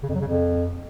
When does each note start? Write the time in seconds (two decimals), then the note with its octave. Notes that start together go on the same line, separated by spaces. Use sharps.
0.03 C#3
0.09 F2
0.15 F#3
0.21 C#3
0.27 F2